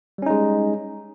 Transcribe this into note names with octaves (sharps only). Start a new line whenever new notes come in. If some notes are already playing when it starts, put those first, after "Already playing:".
G3 G#3 C#4 D#4